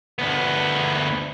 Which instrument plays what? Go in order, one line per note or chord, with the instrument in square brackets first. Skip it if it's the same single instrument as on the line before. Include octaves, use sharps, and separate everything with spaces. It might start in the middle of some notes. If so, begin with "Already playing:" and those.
[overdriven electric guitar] D2 B3